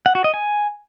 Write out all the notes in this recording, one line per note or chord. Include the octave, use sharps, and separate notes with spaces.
F#5
F#4
D#5
G#5